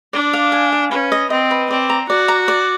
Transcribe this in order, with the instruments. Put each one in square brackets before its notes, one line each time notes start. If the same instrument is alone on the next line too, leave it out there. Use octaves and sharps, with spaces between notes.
[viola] D4 [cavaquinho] D5
[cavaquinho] F5
G#5
F5
[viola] C#4 [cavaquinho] B4
[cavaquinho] D#5
[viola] C4 [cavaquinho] D#5
[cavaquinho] B4
[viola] C4 [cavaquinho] D5
[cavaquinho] A#5
[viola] F#4 [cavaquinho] D5
[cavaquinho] A#5
D5